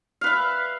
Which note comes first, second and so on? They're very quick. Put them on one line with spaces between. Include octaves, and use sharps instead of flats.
F5 B4 E5